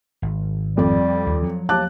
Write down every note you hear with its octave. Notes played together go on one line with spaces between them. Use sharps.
G#1
F2 G3 D5
D#2
F3 F#3
D#2 A5 D6 F#6